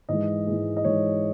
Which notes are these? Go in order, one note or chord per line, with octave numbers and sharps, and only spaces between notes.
G#2 E3 G#3 D#5
G#2 E3 G#3
D#5
G#2 E3 G#3 C#5